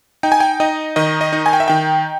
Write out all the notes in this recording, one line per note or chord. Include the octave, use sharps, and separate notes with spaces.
D#4 G5
G#5
G5
D#4 D#5
D#3 D#5
D#5
D#4
G#5
G5
E5
D#3 G5